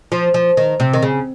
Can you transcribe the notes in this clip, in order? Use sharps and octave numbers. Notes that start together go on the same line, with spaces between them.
F3
F3
D#3
C3
D#3
C#3